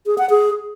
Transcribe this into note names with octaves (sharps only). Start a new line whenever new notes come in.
G#4
F#5
G#4